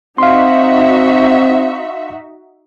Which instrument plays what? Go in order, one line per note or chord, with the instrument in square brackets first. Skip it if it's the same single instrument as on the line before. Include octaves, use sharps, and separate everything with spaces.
[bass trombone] C4 [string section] D#4 F#4 E5 [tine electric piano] F5 C6